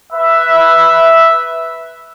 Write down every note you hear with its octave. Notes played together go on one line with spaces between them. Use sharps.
B4 E5